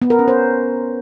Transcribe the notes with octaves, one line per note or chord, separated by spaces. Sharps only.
B3
A#4
C#4
C5